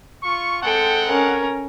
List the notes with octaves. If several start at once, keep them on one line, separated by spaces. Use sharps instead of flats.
F4 C#6
G#3 C4 A4 F#5 G5
C#4 A#4